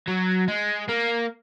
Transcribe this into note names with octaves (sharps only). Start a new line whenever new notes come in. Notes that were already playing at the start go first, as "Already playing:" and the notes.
F#3
G#3
A#3